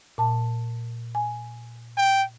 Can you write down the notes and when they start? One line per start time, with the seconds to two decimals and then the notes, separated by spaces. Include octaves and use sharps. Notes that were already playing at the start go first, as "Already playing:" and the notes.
0.18 A#2 A5
1.15 G#5
1.98 G5